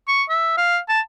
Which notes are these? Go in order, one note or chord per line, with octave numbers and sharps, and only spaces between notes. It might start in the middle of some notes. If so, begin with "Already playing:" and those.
C#6
E5
F5
A5